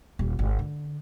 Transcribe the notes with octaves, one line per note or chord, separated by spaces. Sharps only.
D#1
G#1
D3